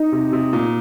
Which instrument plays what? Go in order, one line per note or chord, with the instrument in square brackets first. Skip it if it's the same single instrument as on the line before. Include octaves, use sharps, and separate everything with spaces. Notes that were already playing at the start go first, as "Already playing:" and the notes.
Already playing: [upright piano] D#4
[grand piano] C3
C3
A#2